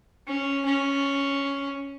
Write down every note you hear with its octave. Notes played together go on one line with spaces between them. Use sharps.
C#4
C#4